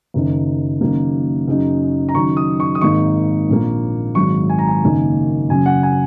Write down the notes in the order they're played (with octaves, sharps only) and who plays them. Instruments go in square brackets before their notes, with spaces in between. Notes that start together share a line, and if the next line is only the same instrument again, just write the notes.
[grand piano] F#1 F#2 D#3
F#1 F#2 D#3 F#3 A#3
F#2 C#3 F#3 D#4
A#5
F#1 F#2 D#3 F#3 D#4 C#6
D#6
C#6
D#6
G#1 G#2 D#3 A#3 D#4 C#6
A#1 A#2 A#3
G#1 G#2 D#3 F#3 C#6
G#5
A#5
G#5
F#1 F#2 D#3 A#3 D#4
F#1 F#2 C#3 F#3 G#5
F#5
G#5